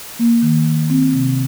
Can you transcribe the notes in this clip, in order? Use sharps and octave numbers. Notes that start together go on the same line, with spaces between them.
A#3
D#3
D#3
C4
C3